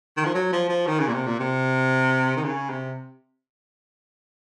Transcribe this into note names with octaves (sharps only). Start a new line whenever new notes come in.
D#3
F3
F#3
F3
F3
D#3
C#3
A#2
C3
A#2
C3
D#3
C#3
C3